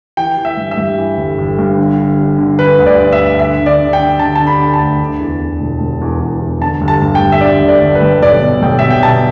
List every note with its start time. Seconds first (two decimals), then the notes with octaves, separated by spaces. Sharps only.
0.17 E3 G5
0.38 E3
0.45 E5
0.57 G2
0.71 E5
0.77 G2
0.98 E3
1.18 G1
1.38 G1
1.59 G2
1.78 D3
1.98 D3
2.18 D3
2.38 D3
2.59 D3 B4
2.78 D2
2.86 D5
2.99 D3
3.12 E5
3.19 D2
3.39 D3 E5
3.60 D3
3.66 D5
3.80 D3
3.93 G5
4.00 D3
4.19 D3 A5
4.36 D3 A5
4.47 B5
4.60 D3
4.74 A5
4.80 D2
5.00 D3
5.20 E2
5.40 E2
5.61 E1
5.80 E1
6.01 E2
6.20 E2
6.41 E2
6.61 D3 A5
6.81 G1
6.88 A5
7.02 G2
7.15 G5
7.22 G1
7.32 E5
7.41 D3 D5
7.61 G1
7.68 D5
7.81 G1
7.95 B4
8.01 G1
8.22 B1 D5
8.42 B2
8.62 B1 G5
8.79 B2 E5
8.90 G5
9.03 B2 A5